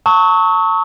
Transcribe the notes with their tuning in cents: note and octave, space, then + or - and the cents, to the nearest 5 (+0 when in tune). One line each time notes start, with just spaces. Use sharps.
A5 +35 C#6 +0 E6 -45